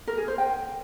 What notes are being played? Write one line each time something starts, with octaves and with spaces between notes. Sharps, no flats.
A#4
G#4
C5
G5